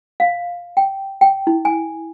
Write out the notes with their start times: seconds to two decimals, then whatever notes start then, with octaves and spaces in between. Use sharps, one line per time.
0.20 F5
0.77 G5
1.21 G5
1.47 E4
1.65 G#5